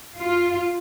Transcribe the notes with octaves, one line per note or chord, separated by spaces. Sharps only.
F4